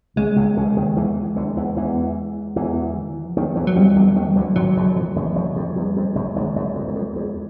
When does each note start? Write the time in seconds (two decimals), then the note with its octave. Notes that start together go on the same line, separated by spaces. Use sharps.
0.16 C#2 C#3 G#3
0.36 C#2 C#3
0.57 C#2 C#3
0.77 D#2 D#3
0.96 E2 E3
1.36 D2 D3
1.57 E2 E3
1.77 E2 E3
2.56 E2 E3
2.94 D3
3.05 D#3
3.15 E3
3.26 F3
3.36 D#2 D#3 F#3
3.56 E2 E3
3.67 F#3
3.76 F2 F3 G3
3.95 E2 E3
4.07 D3
4.16 D#2 D#3 F#3
4.27 G3
4.36 D2 D3 F#3
4.55 G#1 G#2 F#3
4.77 F#1 F#2
4.96 F2 E3
5.16 F#1 F#2
5.35 F#1 F#2 F3
5.56 F2
5.76 E2 G3
5.96 F2
6.15 F#1 F#2 G#3
6.36 G#1 G#2
6.56 F#1 F#2
6.75 F2
6.88 E2
6.95 F2
7.16 E2